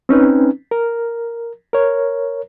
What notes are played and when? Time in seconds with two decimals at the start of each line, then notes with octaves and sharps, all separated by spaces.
0.09 C4 C#4 D#4 B4
0.71 A#4
1.73 A#4 C#5